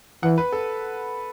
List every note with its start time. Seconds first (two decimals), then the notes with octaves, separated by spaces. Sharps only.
0.23 E3 F#5
0.38 B4
0.52 A4